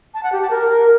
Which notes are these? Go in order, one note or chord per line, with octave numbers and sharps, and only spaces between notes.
A5
F#5
G4
A5
A#4